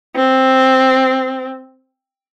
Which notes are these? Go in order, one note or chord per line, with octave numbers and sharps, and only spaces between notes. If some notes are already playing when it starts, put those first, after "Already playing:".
C4